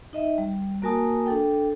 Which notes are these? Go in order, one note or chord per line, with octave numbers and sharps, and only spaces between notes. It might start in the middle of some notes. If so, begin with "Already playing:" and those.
D#4 D#5 E5
G3
A#3 F#4 A#4 G#5 A5 D#6
D4 A4 G5